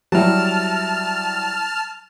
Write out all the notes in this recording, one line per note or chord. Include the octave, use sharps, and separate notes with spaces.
F#3 G3 E4 A5 F6